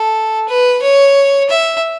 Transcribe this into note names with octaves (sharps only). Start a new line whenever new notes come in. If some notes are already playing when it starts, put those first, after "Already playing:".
Already playing: A4
B4
C#5
E5